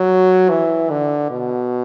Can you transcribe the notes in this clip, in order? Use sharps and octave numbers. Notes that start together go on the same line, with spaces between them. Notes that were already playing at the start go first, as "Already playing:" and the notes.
Already playing: F#3
E3
D3
B2